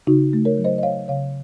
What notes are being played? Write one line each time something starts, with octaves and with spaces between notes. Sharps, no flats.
C#3 D#4 F#4
A3
A#4 C#5
F#3
C5 D#5
D#5
C#3 C#5 F5
C#3 C#5 F5